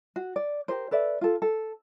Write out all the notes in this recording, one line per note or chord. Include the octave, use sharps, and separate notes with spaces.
F#4
D5
G4 A#4 C5
A4 B4 D5 E5
F4 A4
A4